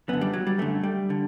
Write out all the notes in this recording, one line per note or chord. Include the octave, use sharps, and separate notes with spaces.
F#2 D3 B3
G3
F#3
G3
F#2 D3 A3
G3
D3